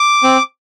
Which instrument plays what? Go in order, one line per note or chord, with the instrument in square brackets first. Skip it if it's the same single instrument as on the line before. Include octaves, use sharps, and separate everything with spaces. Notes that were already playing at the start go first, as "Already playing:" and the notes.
Already playing: [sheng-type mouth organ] D6
C4